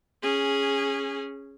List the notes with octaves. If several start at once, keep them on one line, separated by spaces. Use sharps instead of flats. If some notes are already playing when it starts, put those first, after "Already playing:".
C#4 G#4